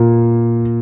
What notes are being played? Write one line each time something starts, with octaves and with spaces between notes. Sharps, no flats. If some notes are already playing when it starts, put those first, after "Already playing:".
Already playing: A#2 A#3